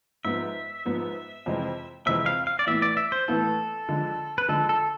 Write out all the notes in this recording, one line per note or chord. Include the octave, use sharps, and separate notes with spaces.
G#2 F3 B3 E5
G#2 F3 B3
F2 C3 E3 G#3
F2 C3 E3 G#3 E5
F5
F5
D5
A2 E3 B3 E4 E5
D5
E5
C5
A2 E3 B3 E4 A4
D3 F3 G#3
B4
D3 F3 G#3 A4
A4